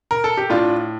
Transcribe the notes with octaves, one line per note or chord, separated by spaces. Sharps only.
A#4
A4
G4
A2 D4 F4